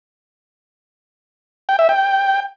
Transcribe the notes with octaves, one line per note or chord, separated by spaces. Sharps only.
G5
E5
G5